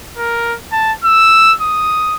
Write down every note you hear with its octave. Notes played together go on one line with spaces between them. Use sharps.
A#4
A5
E6
D#6